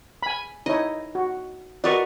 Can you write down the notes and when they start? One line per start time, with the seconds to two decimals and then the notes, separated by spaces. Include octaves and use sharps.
0.23 G#5 B5
0.66 D#4 E4 C#5 D#5
1.15 F#4
1.84 F#4 A#4 B4 D5 D#5 C#6